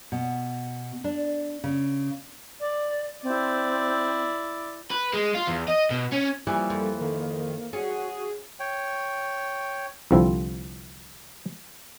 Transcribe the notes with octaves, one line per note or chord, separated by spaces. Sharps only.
B2
D4
C#3
D5
C4 E4 D5
B4
G#3
F4
E2
D#5
B2
C#4
E3 F3 G3 A#3
F2
D#3
C#4 F#4 G#4
C#5 G5
C2 D3 F3 C4 E4